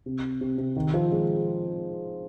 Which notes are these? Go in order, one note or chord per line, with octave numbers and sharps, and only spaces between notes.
C3
C3
C3
D#3
F3
G#3